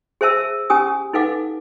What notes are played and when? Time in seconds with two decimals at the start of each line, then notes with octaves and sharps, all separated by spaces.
0.21 G#4 C5 E5 A5 E6
0.70 C#4 G4 G#5 D#6
1.13 D#4 A4 B4 F5 F#5 D6